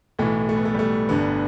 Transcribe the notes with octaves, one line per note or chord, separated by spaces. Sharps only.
B1 A2 E3 A3
A3
B3
A3
G3
A3
G1 G2 D3 B3